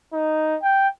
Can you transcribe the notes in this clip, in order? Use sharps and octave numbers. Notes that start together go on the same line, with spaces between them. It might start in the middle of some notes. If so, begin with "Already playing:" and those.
D#4
G5